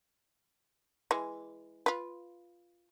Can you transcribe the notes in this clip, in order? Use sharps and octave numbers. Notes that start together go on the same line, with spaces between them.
E3 G#3
F4 B4